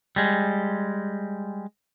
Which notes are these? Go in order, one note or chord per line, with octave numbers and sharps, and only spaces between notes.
G3 G#3